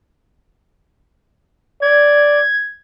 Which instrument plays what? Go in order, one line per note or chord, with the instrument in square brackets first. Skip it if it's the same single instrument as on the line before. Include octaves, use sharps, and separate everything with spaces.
[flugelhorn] D5 [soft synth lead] G#6